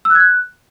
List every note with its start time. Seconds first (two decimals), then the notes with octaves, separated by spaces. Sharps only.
0.05 E6
0.10 F#6
0.15 G#6
0.20 F#6